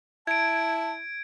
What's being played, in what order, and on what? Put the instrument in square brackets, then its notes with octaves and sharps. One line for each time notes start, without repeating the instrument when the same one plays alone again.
[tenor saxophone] E4 [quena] A5 [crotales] G#6 D7